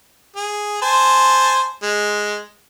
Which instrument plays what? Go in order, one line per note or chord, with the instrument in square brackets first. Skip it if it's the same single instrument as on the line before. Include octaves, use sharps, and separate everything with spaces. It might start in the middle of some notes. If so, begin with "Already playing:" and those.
[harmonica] G#4
C5 G#5 A5
G#3